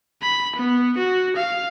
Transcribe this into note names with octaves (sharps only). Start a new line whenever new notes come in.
B5
B3
F#4
F5